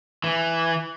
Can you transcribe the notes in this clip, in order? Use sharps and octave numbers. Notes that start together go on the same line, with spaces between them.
E3